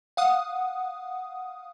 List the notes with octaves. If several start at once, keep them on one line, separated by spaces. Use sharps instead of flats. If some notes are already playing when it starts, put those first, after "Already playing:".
F5 F#5 D#6